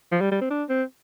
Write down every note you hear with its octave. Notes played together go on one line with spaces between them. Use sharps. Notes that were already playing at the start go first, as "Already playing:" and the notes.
F3
G3
G3
C4
D4
C4